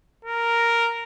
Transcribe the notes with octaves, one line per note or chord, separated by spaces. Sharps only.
A#4